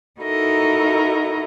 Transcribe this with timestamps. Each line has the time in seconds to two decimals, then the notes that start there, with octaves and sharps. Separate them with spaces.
0.20 D#4 E4 F#4 A4 A#4 D#5